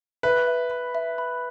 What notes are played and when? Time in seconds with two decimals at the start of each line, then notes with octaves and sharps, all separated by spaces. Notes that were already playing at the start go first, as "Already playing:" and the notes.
0.23 B4 E5
0.47 E5
0.71 B5
0.95 E5
1.18 B5